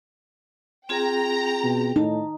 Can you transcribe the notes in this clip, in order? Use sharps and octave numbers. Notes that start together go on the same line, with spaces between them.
C4 F4 G#4 G5 A#5
B2
A2 D#4 A5